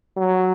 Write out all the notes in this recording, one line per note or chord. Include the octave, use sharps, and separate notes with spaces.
F#3